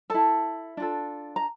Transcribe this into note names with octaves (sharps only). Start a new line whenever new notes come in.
E4 A4 A5
D4 F4 A4
A#5